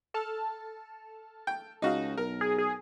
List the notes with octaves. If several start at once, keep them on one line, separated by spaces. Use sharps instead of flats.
A4 A5 F6
G5
C#2 D#4 F#4 F5
B1 A#4
G#4
G#4